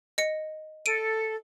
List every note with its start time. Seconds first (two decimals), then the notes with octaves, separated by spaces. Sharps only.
0.18 D#5 C#7
0.86 A4 D7 D#7